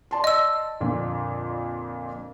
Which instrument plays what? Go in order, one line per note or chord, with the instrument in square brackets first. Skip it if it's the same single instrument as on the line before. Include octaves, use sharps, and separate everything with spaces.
[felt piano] D5 A5 C6
[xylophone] D#5 E6
[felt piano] F2 A#2 D3